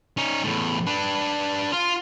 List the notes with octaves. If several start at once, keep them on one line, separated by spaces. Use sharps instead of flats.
C#4 D#4
E2 A2
D4 B4
F4